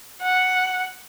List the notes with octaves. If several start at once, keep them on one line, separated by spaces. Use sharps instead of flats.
F#5